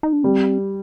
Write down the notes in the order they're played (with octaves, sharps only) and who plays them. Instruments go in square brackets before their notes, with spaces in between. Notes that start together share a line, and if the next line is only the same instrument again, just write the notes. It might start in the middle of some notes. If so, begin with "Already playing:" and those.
[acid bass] D#4
D4
[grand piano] G3 [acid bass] C4